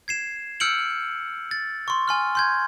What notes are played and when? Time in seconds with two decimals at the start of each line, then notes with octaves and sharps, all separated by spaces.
0.08 G#6 C7 E7
0.60 E6 F6 G6 C#7 D7 F#7
1.51 A6
1.88 C6 C#6
2.08 G#5 C6 F6
2.35 C6 G6 G#6